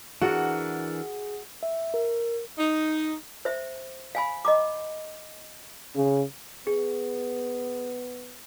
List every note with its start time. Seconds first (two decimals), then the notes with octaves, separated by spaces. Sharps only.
0.22 E3 D4 F#4 G#4 A#4 F#5
1.63 E5
1.94 A#4
2.58 D#4
3.45 C5 E5
4.15 F5 G#5 B5
4.45 D#5 A#5 D6
5.94 C#3
6.67 B3 G#4